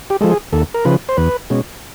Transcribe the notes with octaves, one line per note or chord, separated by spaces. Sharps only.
G4
F3 G#3 A4
G#4
D#2 A4
A#4
C#3 F3 B4
C5
E2 B4
B2 G#3 C#4